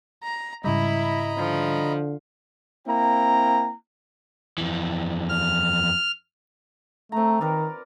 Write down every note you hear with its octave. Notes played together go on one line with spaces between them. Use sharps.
A#5
G#2 C#3 G3 E4 D#5 A#5 B5
D3 F3
A#3 C4 E4 G5 A#5
F2 E3
F6
A3 C4 A#5
D#3 A#4 B4 D5